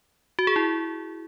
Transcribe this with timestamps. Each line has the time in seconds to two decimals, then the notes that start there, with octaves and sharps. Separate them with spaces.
0.39 F#4
0.47 G#4
0.56 E4